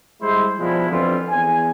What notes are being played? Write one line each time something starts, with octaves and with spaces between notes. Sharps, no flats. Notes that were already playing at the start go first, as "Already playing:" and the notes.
G3 G#3 E4 C5
B2 F3 G3 G#3 E4
F2 D3 E3 G3 F4
E2 G#5